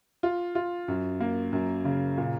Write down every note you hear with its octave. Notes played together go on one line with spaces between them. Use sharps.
F4
F4
F#2
A#3
F#2
C#3
A#2